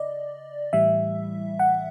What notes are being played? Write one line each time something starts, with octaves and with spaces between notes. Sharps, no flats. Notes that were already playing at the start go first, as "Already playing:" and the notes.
Already playing: C#3 D5 D#5
A2 E3 G3 E5
F#5